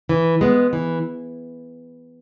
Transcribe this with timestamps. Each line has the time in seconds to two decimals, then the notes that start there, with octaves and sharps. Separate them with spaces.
0.09 E3
0.41 G#3 B3
0.73 E3